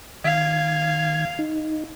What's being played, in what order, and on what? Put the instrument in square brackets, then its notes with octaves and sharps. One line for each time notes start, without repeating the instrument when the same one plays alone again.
[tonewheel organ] D#3 G#6 [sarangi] F5
[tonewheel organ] D#4